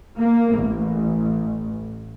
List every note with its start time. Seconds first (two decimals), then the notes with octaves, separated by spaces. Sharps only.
0.18 A#3
0.58 A1